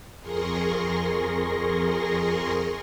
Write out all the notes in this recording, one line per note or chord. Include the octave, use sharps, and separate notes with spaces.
F2 G#4 A#4 C6 C#6 A#6